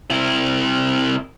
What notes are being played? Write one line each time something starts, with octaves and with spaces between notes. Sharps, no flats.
C3 E4